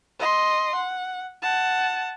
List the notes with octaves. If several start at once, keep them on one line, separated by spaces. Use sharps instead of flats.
D#5 C6
F#5
F#5 A5